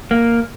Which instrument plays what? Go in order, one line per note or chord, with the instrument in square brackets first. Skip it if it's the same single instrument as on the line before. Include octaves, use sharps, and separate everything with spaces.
[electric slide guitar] A#3